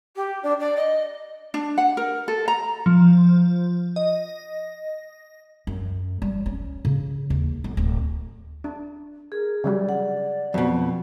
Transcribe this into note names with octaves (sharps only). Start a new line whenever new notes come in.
G4
D4
D5
D#5
D4
F#5
A#4
A4
A#5
F3
D#5
F#2
G3
C#4
C#3
D#2
B1
D1
D4
G#4 A#4
C#3 F#3 G3 D5
F#5
F2 B2 F#3